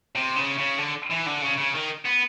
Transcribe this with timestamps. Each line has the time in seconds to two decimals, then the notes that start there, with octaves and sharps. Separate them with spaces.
0.15 C3
0.36 C#3
0.58 C#3
0.78 D3
1.10 E3
1.26 D3
1.42 C#3
1.57 C#3
1.74 D#3
2.05 B3